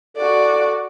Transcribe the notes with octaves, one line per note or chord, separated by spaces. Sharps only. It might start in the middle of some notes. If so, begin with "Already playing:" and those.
F#4 A4 D5